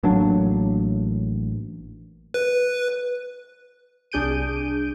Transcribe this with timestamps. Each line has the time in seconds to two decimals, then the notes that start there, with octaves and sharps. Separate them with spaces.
0.03 A1 F#3 A#3 D4
2.34 B4
4.12 C2 D4 G#4 G6 D7 D#7